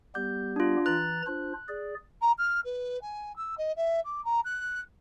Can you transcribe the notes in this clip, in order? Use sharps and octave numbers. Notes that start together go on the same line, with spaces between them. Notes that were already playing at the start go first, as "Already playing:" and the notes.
G3 B3 G4 G6
D4 F4
E3 A#5 F#6 A6
D4 F4 C5
G#4 D5
A#5
F6
B4
G#5
E6
D#5
E5
D6
A#5
F#6